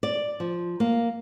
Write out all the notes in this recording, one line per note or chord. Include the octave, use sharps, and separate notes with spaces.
D5
F3
A#3